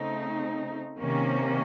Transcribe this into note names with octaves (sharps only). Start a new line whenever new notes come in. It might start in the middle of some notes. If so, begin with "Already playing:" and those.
Already playing: C#3 A3 C4 D#4
C3 D#3 A#3 C#4